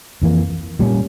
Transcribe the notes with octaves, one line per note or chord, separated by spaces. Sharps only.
F2 E3 A#3
A#2 G3 A#3 C#4